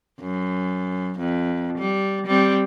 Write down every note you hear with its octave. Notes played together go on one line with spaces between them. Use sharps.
F#2
F2
G3
G3 C4